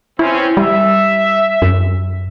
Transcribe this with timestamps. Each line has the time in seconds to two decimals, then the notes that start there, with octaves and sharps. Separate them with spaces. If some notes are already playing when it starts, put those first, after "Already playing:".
0.19 E3 C4 C#4 E4
0.57 G3 E5
1.62 F#2